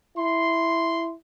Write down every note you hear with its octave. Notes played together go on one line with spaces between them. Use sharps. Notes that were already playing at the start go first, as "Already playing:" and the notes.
E4 C6